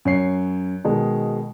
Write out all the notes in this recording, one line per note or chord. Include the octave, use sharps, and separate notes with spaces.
F#2 C#5 C7
B2 D#3 G#3